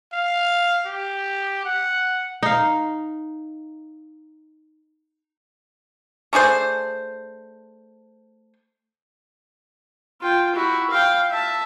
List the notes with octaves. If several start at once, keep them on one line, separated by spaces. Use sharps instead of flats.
F5
G4
F#5
D#4 F5
A3 D4 G#4 C5
F4 G5
E4 F#4
F5 G5
E5 A5